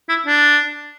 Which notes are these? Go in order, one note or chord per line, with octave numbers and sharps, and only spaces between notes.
E4
D4